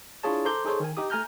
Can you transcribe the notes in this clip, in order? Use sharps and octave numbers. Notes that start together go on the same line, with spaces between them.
D4 E4 F4 G#4 C#5 A5
A4 C5 A#5 C6 D6 G6
D#4 G#4 A4 C5 C#5
D#3 G#5
D#4 G4 D#6
A3 G#5 A#5 F6 G6